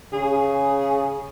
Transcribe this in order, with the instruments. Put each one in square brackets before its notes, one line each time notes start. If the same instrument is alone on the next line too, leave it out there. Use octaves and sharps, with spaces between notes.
[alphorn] C#3 [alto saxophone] G#4